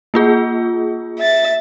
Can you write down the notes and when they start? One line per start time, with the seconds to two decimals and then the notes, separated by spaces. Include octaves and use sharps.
0.14 A#3 F4 G#4
1.19 E5 A6